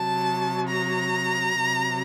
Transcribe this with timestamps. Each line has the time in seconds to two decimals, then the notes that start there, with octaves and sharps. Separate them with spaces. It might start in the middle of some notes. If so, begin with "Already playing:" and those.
Already playing: C3 F#3 A5
0.69 A#5
1.61 C3 F#3